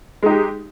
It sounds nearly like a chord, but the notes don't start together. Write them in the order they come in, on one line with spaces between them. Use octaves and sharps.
G#3 D#4 G4